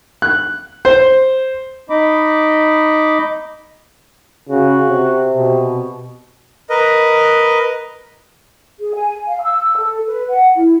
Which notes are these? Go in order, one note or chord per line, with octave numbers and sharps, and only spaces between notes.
F#6
C5
D#4 D#5 B5 D6
C#3 F#4
C3
B2
A#4 B4 D#5
G#4
G#5
F5
E6
A4
B4
F#5
E4